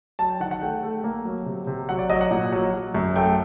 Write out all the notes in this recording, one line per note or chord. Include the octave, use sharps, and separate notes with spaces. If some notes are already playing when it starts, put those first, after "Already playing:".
F#3 A5
G5
D#3 F#5
F#5
A3 G5
A3
A#3
F#3
C3
C3
F#3 F#5
D5
F#3 D#5
F#5
A#2
F#3
F#3
F#2
A3 G5